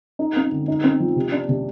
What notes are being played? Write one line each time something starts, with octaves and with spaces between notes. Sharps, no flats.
D#4
C4
D3
D#4
C4
F3
C3
D4
C3